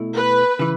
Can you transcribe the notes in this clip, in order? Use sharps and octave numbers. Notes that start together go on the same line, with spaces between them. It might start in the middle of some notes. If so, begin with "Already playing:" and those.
Already playing: B2 A3 E4
B4
C#3 E3